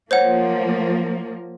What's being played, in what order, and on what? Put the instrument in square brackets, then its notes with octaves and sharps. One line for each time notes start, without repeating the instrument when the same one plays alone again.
[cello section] F3 A#3 [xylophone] C5 C#5 F#5